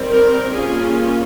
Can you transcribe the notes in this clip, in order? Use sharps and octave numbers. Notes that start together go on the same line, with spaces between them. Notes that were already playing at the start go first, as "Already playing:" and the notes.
Already playing: D#3 G3 C4
A#4
G3 A#3 C#4 F4 G#4